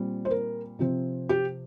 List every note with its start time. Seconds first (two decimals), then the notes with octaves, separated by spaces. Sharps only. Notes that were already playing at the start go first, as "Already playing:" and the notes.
Already playing: A#2 G3 C4
0.25 C5
0.31 A#4
0.79 C3 F3 C4
1.29 G4